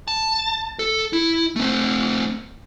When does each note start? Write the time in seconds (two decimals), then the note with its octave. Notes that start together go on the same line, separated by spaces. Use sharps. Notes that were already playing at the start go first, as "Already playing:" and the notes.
0.08 A5
0.79 A4
1.13 E4
1.56 A3 C4